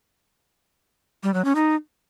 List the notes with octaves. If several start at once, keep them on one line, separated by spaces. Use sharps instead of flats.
G3
F#3
C#4
D#4